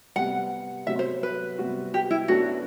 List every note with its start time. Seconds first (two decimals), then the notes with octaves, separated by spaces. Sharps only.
0.16 C3 G3 B3 F#5
0.87 C3 F#3 B3 E5
0.99 C5
1.23 B4
1.58 C3 G3 B3 F#4
1.94 G4
2.11 E4
2.28 F#2 F#3 B3 D4 F#4 A4